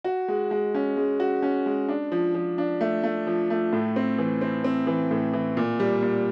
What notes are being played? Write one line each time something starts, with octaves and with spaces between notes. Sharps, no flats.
F#4
G#3
G#3
C#4
G#3
F#4
C#4
G#3
D4
F3
F3
D4
A3
A3
F3
A3
A2
C4
E3
C4
C4
E3
A2
E3
A#2
G3
A#2